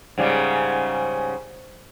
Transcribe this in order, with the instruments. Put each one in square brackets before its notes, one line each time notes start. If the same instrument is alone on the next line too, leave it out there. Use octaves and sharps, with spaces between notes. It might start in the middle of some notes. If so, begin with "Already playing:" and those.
[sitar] G#2 C#3 G3